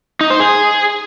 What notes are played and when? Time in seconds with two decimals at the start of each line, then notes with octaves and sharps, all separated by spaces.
0.21 D#4
0.30 C5
0.40 G#4